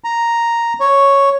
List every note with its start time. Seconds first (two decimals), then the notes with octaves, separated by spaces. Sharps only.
0.04 A#5
0.80 C#5